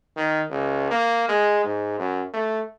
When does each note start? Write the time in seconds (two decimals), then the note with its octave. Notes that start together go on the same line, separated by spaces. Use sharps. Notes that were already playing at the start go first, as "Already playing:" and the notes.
0.17 D#3
0.50 C#2
0.91 A#3
1.29 G#3
1.64 G#2
1.98 F#2
2.33 A3